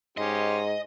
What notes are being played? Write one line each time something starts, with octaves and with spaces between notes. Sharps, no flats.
G#2 C#4 G4 D#5 C6